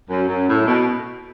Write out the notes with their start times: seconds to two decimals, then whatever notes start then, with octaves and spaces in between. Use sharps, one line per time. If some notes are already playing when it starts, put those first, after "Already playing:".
0.10 F#2
0.28 F#2
0.49 A2
0.67 B2